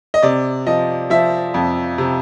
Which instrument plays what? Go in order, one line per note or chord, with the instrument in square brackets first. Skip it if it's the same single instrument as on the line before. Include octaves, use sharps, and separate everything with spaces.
[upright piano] D#5
C3 D5
F3 D#5
F3 E5
F2
C3